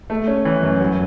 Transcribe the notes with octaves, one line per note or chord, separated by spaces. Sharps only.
A3
C#4
E3
F#2
F#3